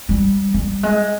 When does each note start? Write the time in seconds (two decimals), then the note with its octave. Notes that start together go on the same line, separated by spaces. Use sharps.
0.09 G3
0.54 G3
0.83 G#3